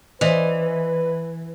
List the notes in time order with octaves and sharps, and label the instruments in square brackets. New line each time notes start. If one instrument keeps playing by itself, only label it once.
[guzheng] E3 [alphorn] B4 [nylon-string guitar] C5 D5 D#5